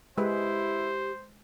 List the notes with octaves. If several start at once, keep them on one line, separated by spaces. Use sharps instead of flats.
G#3 E4 G4 B4 C5